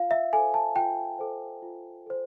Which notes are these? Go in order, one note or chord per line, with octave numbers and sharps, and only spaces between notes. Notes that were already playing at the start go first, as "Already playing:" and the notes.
Already playing: F4 F5
E5
A4 C5 G#5
A5
F4 G5
A4 C5
F4
A4 C5